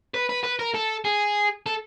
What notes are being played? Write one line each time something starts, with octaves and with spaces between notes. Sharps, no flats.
B4
B4
B4
A#4
A4
G#4
A4